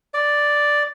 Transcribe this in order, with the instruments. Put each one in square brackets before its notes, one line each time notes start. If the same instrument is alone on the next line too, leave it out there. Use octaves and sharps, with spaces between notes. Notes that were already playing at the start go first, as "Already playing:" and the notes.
[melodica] D5